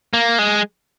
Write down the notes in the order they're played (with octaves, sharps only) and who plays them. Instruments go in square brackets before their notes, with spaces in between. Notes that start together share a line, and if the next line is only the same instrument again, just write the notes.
[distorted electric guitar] A#3
G#3